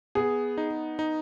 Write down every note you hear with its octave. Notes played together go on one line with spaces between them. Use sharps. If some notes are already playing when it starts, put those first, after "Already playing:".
B3 G#4
D#4
D#4